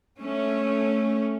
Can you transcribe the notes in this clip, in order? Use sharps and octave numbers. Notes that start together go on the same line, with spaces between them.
A3 C#4